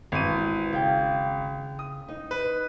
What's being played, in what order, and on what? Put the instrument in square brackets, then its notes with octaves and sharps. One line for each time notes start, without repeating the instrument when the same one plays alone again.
[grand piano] G#1 D#7 [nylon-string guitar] E3
[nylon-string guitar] C#3 G5
[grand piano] D#6
[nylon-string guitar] D#4
[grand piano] B4